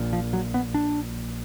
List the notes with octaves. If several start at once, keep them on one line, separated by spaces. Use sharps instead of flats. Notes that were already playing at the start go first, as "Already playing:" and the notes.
Already playing: A#1 A#2
F3
F#3
B3
D4